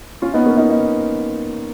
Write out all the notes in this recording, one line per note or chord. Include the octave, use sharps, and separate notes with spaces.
C#4 F4
B3 D#4
A#3 C#4
B3 D#4
B3 D#4